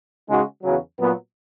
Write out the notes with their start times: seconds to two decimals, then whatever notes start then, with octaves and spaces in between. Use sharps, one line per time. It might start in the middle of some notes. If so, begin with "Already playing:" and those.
0.28 C#3 G#3 D#4 F#4
0.63 E2 C#3 F#3
0.99 A#2 F#3 B3